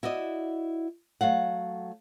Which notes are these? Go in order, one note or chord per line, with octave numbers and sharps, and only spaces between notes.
E4 F#4 D5 D#5
F#3 A3 F5 F#5